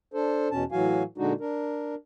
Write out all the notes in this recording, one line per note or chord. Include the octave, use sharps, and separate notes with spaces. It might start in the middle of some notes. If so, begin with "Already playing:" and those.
D4 A4 C5
E2 B2 C#4 A5
A2 E3 F#3 F#4 F5 G#5
A#2 D3 G#3 D4 D#4 F#4
D4 A#4